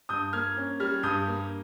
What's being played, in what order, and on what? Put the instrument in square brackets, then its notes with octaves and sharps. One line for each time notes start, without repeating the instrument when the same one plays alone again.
[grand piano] G2 D#6 G6
A#3 F6 G#6
C#4
G3 F6 G#6
G2 D#6 G6
A#3